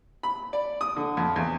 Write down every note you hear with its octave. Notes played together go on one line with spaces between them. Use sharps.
B5
D5
D#6
D3
F2
E2